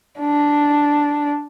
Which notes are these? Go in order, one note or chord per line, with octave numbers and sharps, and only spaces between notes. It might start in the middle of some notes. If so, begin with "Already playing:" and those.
D4